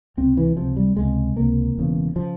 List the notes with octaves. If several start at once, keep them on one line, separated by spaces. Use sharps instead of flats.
C#2 C3 C4
E3
C#2 C3 F3
G3
C#2 C3 G#3
C#2 C3 A#3
E1 E2 C#3
C#3 F3